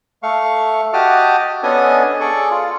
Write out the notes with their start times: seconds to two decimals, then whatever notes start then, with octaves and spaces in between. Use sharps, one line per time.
0.23 A3 F5 C#6
0.93 F#4 G4 D#5 A5 D6 F6
1.63 B3 C#4 D4 A4 D#5 G#5
2.21 G#4 A4 D5 C#6
2.51 F4